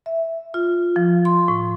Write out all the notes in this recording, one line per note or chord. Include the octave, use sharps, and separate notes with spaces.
E5
F4
F3
C6
A2